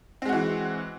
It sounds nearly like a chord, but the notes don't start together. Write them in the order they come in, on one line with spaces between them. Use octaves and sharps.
C4 G#3 F#4 E3